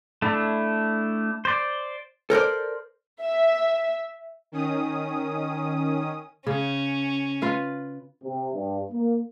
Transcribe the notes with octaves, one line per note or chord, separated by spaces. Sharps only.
A3 D4 E4
C5 D5
A4 A#4 C5 D5
E5
D#3 C#4 D#6
C#3 C#4
F4 B4 F5
C3
G2
A#3